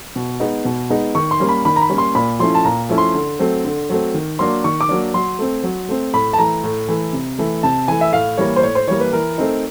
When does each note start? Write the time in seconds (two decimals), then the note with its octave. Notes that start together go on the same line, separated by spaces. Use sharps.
0.16 B2
0.40 G#3 B3 D#4
0.65 B2
0.90 G#3 B3 D#4
1.15 D#3 C#6
1.31 C6
1.40 G3 A#3 C#4
1.49 B5
1.65 D#3 B5
1.76 A#5
1.82 B5
1.90 G3 A#3 C#4
1.98 C6
2.15 A#2 B5
2.39 F3 A3 C#4 E4 C6
2.54 A5
2.64 A#2 A#5
2.89 F3 A3 C#4 E4
2.98 C6
3.14 D3
3.39 F#3 A3 C4
3.64 D3
3.89 F#3 A3 C4
4.14 D#3
4.39 F#3 A#3 D4 C6
4.64 D#3 C#6
4.81 D6
4.89 F#3 A#3 D4
5.14 F#3 C6
5.39 A3 C4
5.63 F#3
5.89 A3 C4
6.13 A2 B5
6.33 A5
6.39 E3 A3 A#5
6.64 A2
6.88 E3 A3
7.13 C3
7.39 E3 A3
7.63 C3 A5
7.88 E3 A3 G#5
8.01 E5
8.13 A2 F5
8.37 E3 G3 A#3 C#5
8.56 C5
8.62 A2 C#5
8.75 C5
8.88 E3 G3 A#3 C#5
9.00 B4
9.13 E3 A#4
9.38 A3 C4 D#4